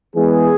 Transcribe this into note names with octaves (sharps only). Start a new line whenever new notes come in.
E3 G#3 B3 G#4